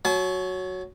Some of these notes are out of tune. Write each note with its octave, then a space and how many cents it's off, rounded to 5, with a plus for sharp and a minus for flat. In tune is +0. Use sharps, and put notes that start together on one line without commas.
F#3 +0 A5 -45